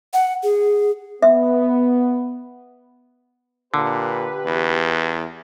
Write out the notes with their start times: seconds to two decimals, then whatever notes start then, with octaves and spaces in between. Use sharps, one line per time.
0.14 F#5
0.43 G#4
1.22 B3 E5
3.74 A#2 D3 G4 B4
4.45 E2